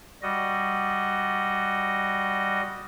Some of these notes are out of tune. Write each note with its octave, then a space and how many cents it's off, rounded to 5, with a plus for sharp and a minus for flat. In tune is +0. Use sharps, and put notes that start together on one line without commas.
G3 +0 F#4 +0 D#5 +0